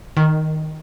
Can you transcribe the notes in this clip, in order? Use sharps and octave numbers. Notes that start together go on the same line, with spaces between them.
D#3